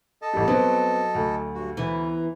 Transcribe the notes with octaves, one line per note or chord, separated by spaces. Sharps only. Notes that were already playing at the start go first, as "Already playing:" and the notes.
A4 D#5 A5
A1 G3
F#3 B3 C4
D2
G2 F#4
E3 B3 A#5